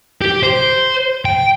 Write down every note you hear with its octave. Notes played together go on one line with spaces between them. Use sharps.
G4
C5
G5